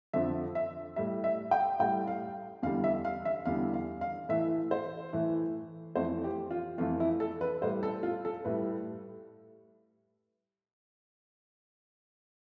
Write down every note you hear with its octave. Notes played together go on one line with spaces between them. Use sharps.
F2 D3 F3 E5
E5
A2 G3 E5
E5
G5
A2 G3 G5
F5
E2 D3 G3 F5
E5
F5
E5
E2 D3 G3 F5
F5
F5
A2 E3 A3 E5
C5
A2 E3 A3
F2 E3 A3 C5
G4
F4
F2 E3 A3 F4
E4
A4
B4
A2 G3 C5
A4
F4
A4
A2 G3 B4